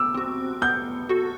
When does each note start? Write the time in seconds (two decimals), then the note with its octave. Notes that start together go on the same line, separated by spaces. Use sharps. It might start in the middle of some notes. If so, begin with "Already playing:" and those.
Already playing: D6 E6
0.14 C4 F#4
0.62 B3 G6
1.09 F#4 A4